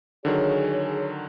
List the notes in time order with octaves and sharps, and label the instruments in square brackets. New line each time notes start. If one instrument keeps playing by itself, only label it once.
[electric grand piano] D3 D#3 F#3 [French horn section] G#4 C#5